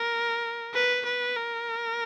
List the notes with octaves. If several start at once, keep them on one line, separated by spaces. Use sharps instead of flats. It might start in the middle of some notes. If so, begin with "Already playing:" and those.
Already playing: A#4
B4
B4
A#4